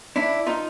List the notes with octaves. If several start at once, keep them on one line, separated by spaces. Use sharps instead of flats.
D4 E4
D#4 F4